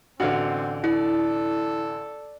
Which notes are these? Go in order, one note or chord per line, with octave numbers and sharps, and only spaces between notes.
A1 D3 C4 F#4 D5 F5
E4 A4 D5